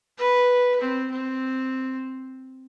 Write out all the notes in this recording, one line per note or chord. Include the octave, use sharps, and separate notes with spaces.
B4
C4
C4